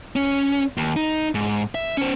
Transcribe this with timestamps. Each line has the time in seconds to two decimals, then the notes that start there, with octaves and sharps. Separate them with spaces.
0.16 C#4
0.77 D#2
0.96 D#4
1.35 G#2
1.75 E5
1.97 C#4 C5